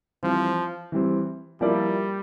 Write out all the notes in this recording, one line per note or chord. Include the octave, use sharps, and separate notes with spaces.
E3 F3 G3 C4
E3 G3 C4
F3 G3 A#3 E4 A#4 D5